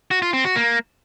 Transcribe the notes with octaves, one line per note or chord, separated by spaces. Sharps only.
F#4
F4
C4
F#4
A#3